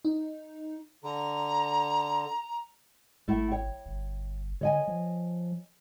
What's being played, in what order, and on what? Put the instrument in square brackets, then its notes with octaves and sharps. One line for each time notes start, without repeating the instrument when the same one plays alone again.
[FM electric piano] D#4
[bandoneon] D3 [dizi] A#5
[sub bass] G#1 [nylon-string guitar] A3 E4 F#5
[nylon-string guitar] C#5 G5
[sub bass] G1
[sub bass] D3 [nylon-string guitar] C#5 D#5 G#5
[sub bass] F3